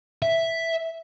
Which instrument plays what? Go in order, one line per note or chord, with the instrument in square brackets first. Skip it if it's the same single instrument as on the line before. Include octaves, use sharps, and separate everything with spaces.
[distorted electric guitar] E5